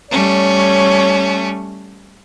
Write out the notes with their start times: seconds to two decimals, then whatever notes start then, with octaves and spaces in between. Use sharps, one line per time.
0.11 G3 A3 C#4 C#5